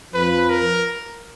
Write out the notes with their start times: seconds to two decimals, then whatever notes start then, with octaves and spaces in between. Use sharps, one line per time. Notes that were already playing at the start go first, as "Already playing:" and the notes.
0.14 F2 F3 B4
0.50 A#4